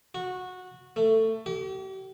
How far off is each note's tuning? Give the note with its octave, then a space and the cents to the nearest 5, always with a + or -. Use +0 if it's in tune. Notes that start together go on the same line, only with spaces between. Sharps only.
F#4 -15
A3 +15
G4 -40